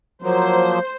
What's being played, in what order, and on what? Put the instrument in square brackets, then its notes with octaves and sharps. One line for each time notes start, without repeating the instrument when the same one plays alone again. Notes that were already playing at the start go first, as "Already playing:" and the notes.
[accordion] F3 F#3 A#3 [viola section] C5